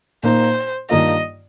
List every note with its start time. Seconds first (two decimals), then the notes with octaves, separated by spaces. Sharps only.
0.23 A#2 A#3 D#4 C5
0.90 G2 D#3 A#3 F4 D#5